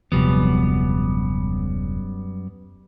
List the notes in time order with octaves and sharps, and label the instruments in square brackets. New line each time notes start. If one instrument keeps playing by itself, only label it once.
[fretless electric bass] D#1 C3 F3 [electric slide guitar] F#2 G3 B3